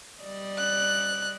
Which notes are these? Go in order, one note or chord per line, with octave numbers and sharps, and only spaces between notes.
G3 D5 D#5
F#6